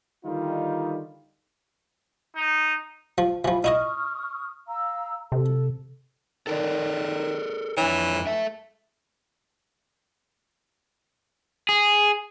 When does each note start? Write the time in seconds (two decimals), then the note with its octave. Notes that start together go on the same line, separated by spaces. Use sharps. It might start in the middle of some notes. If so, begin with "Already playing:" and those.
0.24 D3 D#3 G3 D#4 F4
2.36 D#4
3.18 F3
3.45 E3 F3 B5
3.64 D#4 E4 D#5 C#6 D#6 F6
4.67 F5 A#5 E6
5.32 C3 A4
6.47 D#3 A4 A#4 D5
7.77 F2 E3 D4 C#5
8.27 A4 E5
11.69 G#4